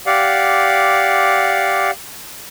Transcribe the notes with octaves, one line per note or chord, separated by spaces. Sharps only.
G4 D5 F5 F#5